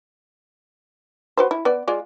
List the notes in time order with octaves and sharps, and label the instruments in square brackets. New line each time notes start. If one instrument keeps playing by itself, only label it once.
[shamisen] F#4 B4 C5
E4
B3 D5
G#3 F4 D5